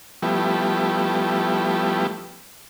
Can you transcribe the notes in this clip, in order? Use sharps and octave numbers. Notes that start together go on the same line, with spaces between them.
F3 G3 A3 B3 E4 G4